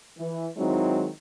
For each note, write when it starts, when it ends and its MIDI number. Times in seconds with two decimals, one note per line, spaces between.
0.18 0.46 52
0.56 1.07 51
0.56 1.07 54
0.56 1.07 56
0.56 1.07 60
0.56 1.07 63
0.56 1.07 64